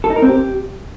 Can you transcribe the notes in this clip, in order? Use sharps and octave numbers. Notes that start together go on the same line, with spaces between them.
A4
D#4
A#4
C4
G4